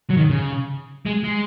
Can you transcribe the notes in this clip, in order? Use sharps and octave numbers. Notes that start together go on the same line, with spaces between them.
F#3
D#3
C#3
G#3
G#3